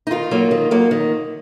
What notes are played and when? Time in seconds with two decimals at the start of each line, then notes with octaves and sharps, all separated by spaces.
0.07 D#4
0.11 D#3 F4
0.31 F#3 A#3
0.51 D#3
0.71 F#3 A#3
0.91 D#3